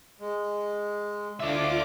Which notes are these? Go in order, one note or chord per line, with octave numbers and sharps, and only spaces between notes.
G#3
D3 F4 D5 E5 D6